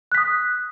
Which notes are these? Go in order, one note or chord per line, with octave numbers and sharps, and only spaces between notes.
D#6 F#6 B6